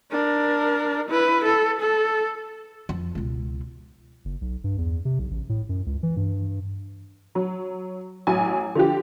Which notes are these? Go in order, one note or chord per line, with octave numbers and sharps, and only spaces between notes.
D4 A#4
E4 B4
A4
A4
F2
C#2 B2
F#1
B1
G2
E2
C3
B1
A1
A2
F#2
C#2
E3
G2
F#3
A1 F#3 G#5
D3 F3 G4